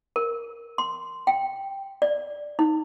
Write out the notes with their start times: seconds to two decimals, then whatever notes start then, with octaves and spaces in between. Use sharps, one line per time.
0.16 A#4
0.78 C6
1.27 G5
2.02 D5
2.59 D#4